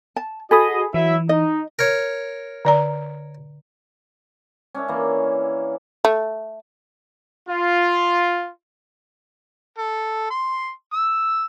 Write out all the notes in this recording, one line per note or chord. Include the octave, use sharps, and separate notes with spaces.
A5
F#4 G#4 A4 D#5 G#5 B5 D#6
E3 F#3 E4 E5
D#4 D#5
A#4 C#5
D3 D5 A#5
C#4 D4 C#5 E5
E3 A#3
A3
F4
A4
C6
E6